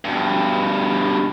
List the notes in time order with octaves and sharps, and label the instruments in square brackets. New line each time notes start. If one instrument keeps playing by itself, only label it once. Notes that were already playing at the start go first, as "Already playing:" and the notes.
[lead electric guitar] G2 B2